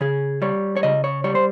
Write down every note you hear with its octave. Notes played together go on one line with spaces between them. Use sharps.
C#3 G#4
G3 C#5
C#5
C#3 D#5
C#5
G3 C#5
C5